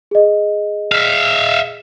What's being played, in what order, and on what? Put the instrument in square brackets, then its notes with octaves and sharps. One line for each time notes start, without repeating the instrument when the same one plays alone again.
[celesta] G#4 D#5
[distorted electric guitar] E5 F5